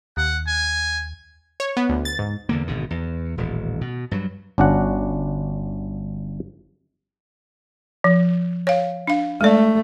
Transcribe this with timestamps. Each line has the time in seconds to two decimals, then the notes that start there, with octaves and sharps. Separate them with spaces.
0.17 D#2 F#5
0.47 G#5
1.60 C#5
1.77 B3
1.89 D2
2.05 A6
2.19 G#2
2.49 E2 D3 A#3
2.67 G#1 B2 D3
2.90 E2
3.37 D#1 A1
3.81 B2
4.11 G2 F#3
4.58 G1 C#4 D4 F#4 F#5
8.04 F3
8.67 C#5 F5
9.07 D4 F5
9.41 G#3 A3 D5